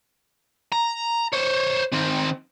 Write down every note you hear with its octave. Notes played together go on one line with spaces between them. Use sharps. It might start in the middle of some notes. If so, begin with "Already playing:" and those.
A#5
C5 C#5
D#3 C4